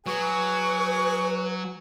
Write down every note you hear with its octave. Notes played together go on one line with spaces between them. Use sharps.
F#3 G#4 B4 G#5 C#6